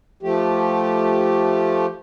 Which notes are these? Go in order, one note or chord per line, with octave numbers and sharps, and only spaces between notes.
F3 A3 G4